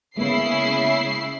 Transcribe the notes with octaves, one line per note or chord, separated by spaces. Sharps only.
C#3 G#3 A#3 B3 E4 C7